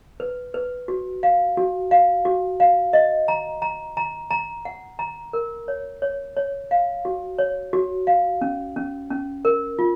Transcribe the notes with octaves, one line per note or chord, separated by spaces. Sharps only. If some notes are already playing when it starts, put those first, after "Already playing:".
B4
B4
F#4
F5
F#4
F5
F#4
F5
D#5
A#5
A#5
A#5
A#5
F#5
A#5
A#4
C#5
C#5
C#5
F5
F#4
C#5
F#4
F5
C#4
C#4
C#4
A#4
F4